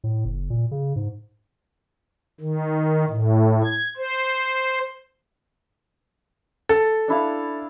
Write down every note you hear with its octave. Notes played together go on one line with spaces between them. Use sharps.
A2
F#1
A#2
C#3
G#2
D#3
A2
G#6
C5
A4
D4 E4 F5